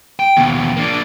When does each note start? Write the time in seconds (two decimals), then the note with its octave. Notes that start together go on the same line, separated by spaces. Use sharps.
0.20 G5
0.37 D#2 B2
0.77 A#3 D4